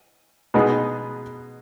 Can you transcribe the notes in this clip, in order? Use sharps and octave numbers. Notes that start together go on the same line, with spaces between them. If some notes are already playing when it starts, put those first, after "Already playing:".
B2 G#3 B3 D#4